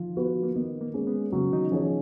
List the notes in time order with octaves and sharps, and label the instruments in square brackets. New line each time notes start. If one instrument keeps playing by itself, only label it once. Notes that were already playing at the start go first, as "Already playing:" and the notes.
Already playing: [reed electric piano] D#3 F3 D#4 F4
[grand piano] B3 F#4 B4
[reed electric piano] A#3
[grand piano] D#3 [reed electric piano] B3
[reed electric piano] A#3
[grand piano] G#3 C#4 G#4
[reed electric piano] B3
[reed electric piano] C#3 C#4 [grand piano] F#3
[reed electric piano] D#3 D#4
[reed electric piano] F3 F4 [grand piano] C#4 G#4 C#5